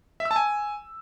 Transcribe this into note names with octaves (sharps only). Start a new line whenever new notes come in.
E5
E6
A5
G#5